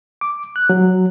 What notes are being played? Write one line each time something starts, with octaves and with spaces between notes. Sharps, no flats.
D6
F#6
F#3